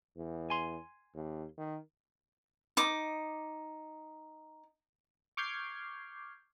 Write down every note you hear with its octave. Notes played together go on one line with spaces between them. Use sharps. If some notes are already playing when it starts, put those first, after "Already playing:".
E2
G#5 C6
D#2
D#3
D#4 D6
C#6 D6 F6 G6 G#6 C7